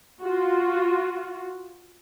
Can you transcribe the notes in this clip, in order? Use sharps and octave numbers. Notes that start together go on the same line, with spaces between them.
F4 F#4